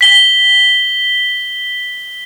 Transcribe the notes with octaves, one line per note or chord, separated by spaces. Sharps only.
B6 G7